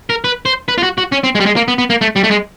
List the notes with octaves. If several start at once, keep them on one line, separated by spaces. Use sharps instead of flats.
A#4
B4
C5
B4
F4
F#4
F#4
C#4
C4
G#3
G3
G#3
A#3
B3
B3
A#3
A3
G3
A3
G#3